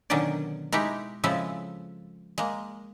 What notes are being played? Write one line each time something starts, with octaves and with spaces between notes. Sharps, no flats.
B2 D3 D#3 F#3 C#4 D5
G#3 D#4 E4 G4
C#3 F3 G#3 C4 E4 A4
G#3 A#3